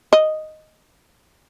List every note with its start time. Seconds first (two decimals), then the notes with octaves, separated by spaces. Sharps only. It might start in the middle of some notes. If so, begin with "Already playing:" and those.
0.13 D#5